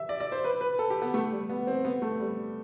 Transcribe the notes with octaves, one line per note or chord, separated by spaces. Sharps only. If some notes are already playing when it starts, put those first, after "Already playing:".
Already playing: E5
D5
D5
C5
B4
B4
A4
G4
B3
A3
G3
B3
C4
B3
A3
G3